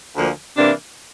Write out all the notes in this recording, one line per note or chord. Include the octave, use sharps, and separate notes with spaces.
D2 D3 F3 A#3
C3 E3 A#3 D4